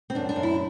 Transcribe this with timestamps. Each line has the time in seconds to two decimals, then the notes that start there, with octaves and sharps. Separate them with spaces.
0.10 C4
0.15 F#2 D4
0.29 D4
0.36 F#2
0.43 E4